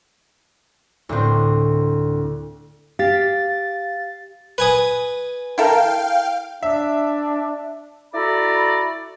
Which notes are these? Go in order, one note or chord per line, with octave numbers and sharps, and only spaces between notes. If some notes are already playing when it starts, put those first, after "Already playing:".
D2 A2 C4
G4 F5 A6
B4 G#5 D#6
E4 A4 A#4 F5 G5
D4 E5
E4 F#4 A4 D5 A#5 B5